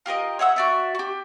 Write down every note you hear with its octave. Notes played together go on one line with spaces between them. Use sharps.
F4 G4 A#4 D#5
C#5 E5 F#5 E6
F#4 D5 E5
F#4 G4